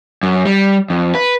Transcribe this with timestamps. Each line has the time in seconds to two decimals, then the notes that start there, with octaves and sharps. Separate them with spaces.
0.23 F#2
0.45 G3
0.90 F2
1.15 B4